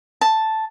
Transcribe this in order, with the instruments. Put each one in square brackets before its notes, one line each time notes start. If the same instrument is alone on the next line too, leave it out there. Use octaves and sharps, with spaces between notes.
[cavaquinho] A5